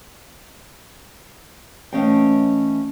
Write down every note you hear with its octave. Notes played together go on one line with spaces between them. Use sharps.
E3 A3 C#4 D#5 F5 G5